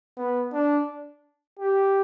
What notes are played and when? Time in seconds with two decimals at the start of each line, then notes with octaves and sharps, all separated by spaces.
0.17 B3
0.53 D4
1.59 G4